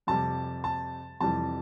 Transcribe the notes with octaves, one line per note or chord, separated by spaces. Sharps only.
F2 C3 G3 A5
A5
F2 C3 E3 G3 A5